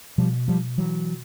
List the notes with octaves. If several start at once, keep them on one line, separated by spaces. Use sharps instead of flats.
B2 F3 G3
F3 G3
E3 F#3